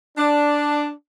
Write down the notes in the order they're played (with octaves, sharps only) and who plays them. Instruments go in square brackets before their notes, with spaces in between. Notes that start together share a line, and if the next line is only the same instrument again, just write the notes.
[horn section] D4